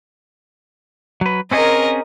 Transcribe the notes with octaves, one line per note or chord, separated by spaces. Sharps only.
F#3 B4
C4 C#4 G#4 A#4 D#5